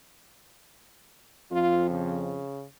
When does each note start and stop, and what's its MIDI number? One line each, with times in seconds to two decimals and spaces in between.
1.52 2.39 41
1.52 1.87 65
1.90 2.65 49